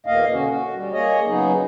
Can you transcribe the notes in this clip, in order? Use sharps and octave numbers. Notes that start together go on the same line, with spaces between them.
E2 B2 A#3 D#5 F5
D3 C#4 F#4
F#4
G3
A#3 G#4 C#5 D#5
C#3 F#3 B3 D#4 G#4